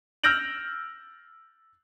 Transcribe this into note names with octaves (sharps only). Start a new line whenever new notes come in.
E6 F6 G6 A#6 D7 F#7